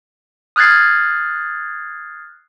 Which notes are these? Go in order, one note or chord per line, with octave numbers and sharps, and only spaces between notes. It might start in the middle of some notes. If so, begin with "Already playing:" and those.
D#6 F6 F#6 G#6 A6 C7